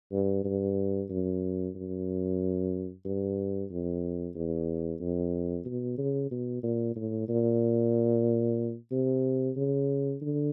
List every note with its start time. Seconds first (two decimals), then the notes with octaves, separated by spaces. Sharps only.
0.12 G2
0.44 G2
1.10 F#2
1.75 F#2
3.05 G2
3.70 F2
4.35 E2
5.00 F2
5.65 B2
5.98 C#3
6.31 B2
6.63 A#2
6.96 A2
7.28 A#2
8.91 C3
9.57 C#3
10.22 D3